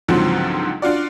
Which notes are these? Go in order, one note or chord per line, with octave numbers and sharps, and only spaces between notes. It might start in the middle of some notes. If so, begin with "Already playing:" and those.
C#2 G#2 D3 F3 F#3 C4
D4 F4 F#4 D5